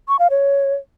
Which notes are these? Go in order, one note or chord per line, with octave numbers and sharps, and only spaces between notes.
C#6
F5
C#5